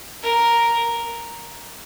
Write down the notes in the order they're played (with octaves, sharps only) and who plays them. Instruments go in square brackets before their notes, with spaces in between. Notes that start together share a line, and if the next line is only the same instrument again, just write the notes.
[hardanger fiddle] A#4